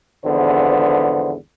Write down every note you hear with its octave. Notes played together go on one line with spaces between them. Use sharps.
G#1 E2 D3 F3 B3 C5